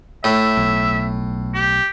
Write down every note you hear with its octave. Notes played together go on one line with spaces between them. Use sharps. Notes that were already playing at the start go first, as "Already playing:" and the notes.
A2 E5
B1
G4